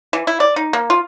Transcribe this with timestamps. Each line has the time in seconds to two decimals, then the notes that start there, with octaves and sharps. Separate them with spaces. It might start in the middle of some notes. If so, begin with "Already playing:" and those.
0.13 E3
0.27 E4
0.40 D5
0.56 D#4
0.73 A#3
0.90 F4